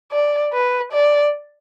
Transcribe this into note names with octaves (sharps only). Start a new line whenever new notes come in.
D5
B4
D5